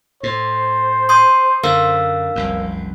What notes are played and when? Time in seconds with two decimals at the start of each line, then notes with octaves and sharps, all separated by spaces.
0.23 A2 C5
1.09 C6 D#6 G6
1.63 F#2 D3 A#4 F5 E6
2.36 F1 C2 F#2